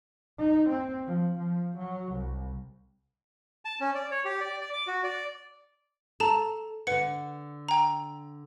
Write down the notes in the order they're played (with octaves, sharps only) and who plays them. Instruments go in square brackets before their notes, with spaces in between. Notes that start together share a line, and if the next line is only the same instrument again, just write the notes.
[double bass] D#4
C4
F3
F3
F#3
C2
[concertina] A5
C#4
D5
C#5
G4
D5
D5
D6
F#4
D5
[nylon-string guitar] A4 [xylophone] A5 A#5 E7
[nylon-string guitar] D3 F#5 [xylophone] B4 C#7
[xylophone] G5 A#5